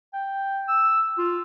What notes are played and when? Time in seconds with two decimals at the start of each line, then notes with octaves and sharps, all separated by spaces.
0.13 G5
0.68 E6
1.18 F4